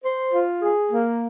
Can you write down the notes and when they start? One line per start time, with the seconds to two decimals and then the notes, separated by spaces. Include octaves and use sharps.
0.03 C5
0.32 F4
0.62 G#4
0.91 A#3